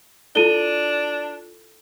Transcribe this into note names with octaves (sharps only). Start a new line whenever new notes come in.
D4 E4 F4 A4 D#7 G7